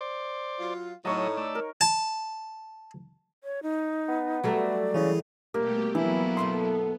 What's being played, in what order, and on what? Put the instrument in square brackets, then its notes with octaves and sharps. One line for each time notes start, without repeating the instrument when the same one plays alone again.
[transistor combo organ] C5 D5
[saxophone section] F#3 F4
[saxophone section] A2 [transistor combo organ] F#3 A4 D#5 [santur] D#4 C#5 A#5
[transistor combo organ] A3 D5 E6
[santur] A#4
[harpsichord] A5
[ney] C#5
D#4
[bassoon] B3
[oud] F#3 G3 A3 [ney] D5
[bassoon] C#3 [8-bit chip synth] E3 E4 G#4
[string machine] B2 A3 G4 [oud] G3 [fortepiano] A#3
[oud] F2 [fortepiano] E3 [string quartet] F#3 A#3 E4 [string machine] B3
[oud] F#2 B2 A3 [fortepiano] C6